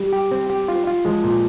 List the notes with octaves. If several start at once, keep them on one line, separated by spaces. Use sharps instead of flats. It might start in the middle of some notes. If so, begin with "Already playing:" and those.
Already playing: G3
G4
C4
G4
F4
F4
F3 G#3
A#2